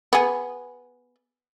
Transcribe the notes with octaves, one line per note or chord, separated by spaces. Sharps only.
B3 G#4